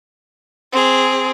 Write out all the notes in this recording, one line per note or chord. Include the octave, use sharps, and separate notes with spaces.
C4 G#4